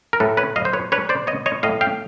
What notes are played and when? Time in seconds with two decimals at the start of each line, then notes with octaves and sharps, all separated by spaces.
0.13 A#4
0.20 A2 A4 B4
0.37 B4 C#5
0.56 F#3 D#5 F5
0.65 C5
0.73 B4 C#5
0.92 D4 B4 C#5
1.09 C5 D5
1.27 B3 C#5 D#5
1.46 C#5 D#5
1.63 A2 D#5 F5
1.81 F5 G5